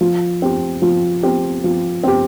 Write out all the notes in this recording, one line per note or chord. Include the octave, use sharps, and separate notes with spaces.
F3
C4 G4
F3
C4 G4
F3
C4 G4